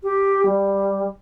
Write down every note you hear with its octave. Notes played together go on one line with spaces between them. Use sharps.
G4
G3